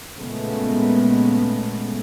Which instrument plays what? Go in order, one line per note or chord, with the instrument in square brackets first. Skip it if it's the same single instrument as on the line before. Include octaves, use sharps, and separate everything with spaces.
[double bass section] A#2 C#3 G#3 A3 B3